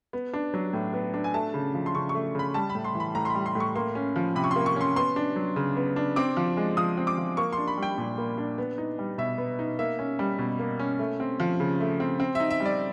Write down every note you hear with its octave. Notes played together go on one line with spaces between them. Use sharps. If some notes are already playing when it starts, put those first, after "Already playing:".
B3
D4
F#3
A2
B3
D4
G#5
A3 A5
C#3
F3
C6
C#3 C#6
C#6
A3
C#3 B5
G3 A5
B5
A2
C6
E3
B5
A2 A#5
C6
G3 B5
C6
A2
C#6
A#3 C6
C#4
F3
C3 B5
C#6
C6
A#3
C#6
C#4 C6
B3 C6
D4
F#3
C#3
B3
D4
C4 D6
F3
G#3
F3 D#6
C4
D6
F3
A#3 C#6
D4 C6
B5
G3
G5
A#2
A#3
D4
B3
D#4
G3
B2 E5
B3
D#4
A#3 E5
C#4
G3
B2
A#3
C#4
A3
C4
F3
C#3
A3
C4
C4
D#4 E5
E5
G3
D5